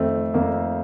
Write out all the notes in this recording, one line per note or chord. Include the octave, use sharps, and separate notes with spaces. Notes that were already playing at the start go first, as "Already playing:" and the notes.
Already playing: F2 D#3 A3 C4
F2 A#3